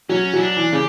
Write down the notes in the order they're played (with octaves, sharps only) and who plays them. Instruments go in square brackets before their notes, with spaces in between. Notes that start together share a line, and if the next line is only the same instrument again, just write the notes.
[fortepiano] F#3 [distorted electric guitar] C#4
[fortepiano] F#3 [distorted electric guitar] E4
[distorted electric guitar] D4
[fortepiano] E3
[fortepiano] C#3 [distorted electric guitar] G4